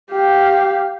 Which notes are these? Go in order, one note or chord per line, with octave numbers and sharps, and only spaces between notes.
G4 F5